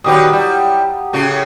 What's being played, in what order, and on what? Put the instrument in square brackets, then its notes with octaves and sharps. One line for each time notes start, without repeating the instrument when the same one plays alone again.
[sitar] A#2 D#3 B4 [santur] F#3 G4 D#6
[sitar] G3 E4
A2 C#3 F#4